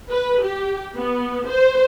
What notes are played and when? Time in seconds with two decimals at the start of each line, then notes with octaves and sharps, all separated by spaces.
0.10 B4
0.42 G4
0.96 B3
1.47 C5